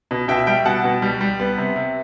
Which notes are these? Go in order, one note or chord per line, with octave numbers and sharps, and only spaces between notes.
B2
B2 E5 G5
G3 E5 G5
B2 F#5 A5
B2
G3
G3
B3
C3
C3